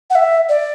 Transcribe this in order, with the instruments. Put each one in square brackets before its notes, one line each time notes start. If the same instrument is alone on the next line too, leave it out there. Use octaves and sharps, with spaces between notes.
[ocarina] F#5
E5
D5